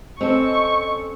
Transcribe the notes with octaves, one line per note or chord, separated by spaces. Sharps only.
C4 C#4 A4 D#5 C#6